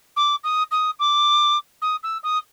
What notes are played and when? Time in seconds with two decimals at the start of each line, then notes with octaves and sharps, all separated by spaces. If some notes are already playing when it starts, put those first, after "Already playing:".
0.16 D6
0.43 D#6
0.71 D#6
0.99 D6
1.81 D#6
2.03 E6
2.23 D#6